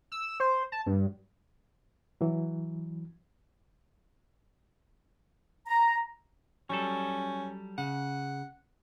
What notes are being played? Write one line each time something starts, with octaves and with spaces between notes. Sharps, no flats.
E6
C5
A5
G2
E3 F#3
A#5
F#3 G3 C#4 A4
C#3 F#5